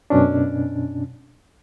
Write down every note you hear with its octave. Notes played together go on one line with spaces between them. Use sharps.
F#2 B2 C#4 D4